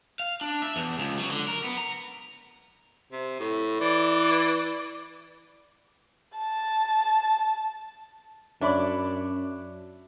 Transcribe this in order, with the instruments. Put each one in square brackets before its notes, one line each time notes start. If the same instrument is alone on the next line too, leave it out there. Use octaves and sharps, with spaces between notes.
[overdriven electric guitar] F5
D4
E5
E2
C#2
F#3
D3
A#4
B3
A#5
[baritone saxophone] C3
A2
[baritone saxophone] E3 [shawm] D5
[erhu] A5
[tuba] F#2 [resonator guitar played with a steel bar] D4 D5 [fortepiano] C#5 E5 B5